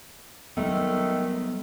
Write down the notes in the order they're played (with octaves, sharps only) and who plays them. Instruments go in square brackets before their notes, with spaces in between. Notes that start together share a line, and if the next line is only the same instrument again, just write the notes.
[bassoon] D#3 [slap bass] F#3 G3 B3 [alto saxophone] A3